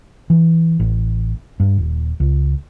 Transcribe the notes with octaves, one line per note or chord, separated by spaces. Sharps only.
E3
A1
G2
D#1
C#2